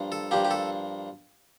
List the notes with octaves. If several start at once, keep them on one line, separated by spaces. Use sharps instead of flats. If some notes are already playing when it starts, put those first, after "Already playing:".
Already playing: G2 F3 A#3
A4
G2 F3 A#3 G4
G4
A4